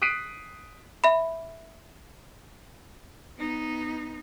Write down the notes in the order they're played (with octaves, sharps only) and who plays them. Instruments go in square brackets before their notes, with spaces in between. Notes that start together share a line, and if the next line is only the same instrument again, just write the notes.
[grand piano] D#6 F#6 B6 C7 D7 D#7
[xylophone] E5 B5
[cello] B3 D#4